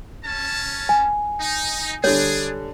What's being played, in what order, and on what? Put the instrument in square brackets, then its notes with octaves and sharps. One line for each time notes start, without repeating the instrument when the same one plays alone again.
[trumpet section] C#4 A5
[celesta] G#5
[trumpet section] D#4
[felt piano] D3 G3 [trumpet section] D4 G#4 [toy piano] C#5